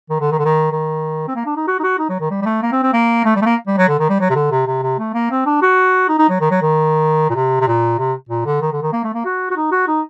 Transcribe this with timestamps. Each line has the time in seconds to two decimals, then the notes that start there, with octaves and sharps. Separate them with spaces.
0.09 D#3
0.20 D3
0.31 D#3
0.38 D3
0.45 D#3
0.72 D#3
1.28 C4
1.35 A#3
1.46 D4
1.57 D#4
1.67 F#4
1.79 D#4
1.83 F#4
1.98 D#4
2.09 F#3
2.20 D#3
2.30 G3
2.42 G3
2.45 A3
2.62 A#3
2.72 C4
2.83 C4
2.93 A#3
3.25 A3
3.36 G3
3.42 A3
3.46 A#3
3.67 G3
3.77 F#3
3.88 D3
3.99 D#3
4.09 G3
4.20 F#3
4.30 C3
4.35 D3
4.51 C3
4.67 C3
4.83 C3
4.99 A3
5.14 A#3
5.31 C4
5.46 D4
5.62 F#4
6.08 D#4
6.19 D#4
6.29 F#3
6.40 D#3
6.51 F#3
6.62 D#3
7.30 A#2
7.35 C3
7.60 C3
7.67 A#2
7.99 C3
8.29 A#2
8.45 D3
8.61 D#3
8.72 D3
8.82 D#3
8.93 A#3
9.04 A3
9.14 A#3
9.25 F#4
9.50 F#4
9.56 D#4
9.72 F#4
9.87 D#4